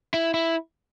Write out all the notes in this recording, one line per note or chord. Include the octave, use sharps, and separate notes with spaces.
E4
E4